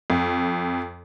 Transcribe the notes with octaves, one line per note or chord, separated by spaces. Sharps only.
F2